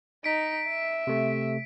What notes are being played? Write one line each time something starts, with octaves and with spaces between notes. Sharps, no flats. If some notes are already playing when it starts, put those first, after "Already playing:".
D#4 B6 D7
E5
C3 A3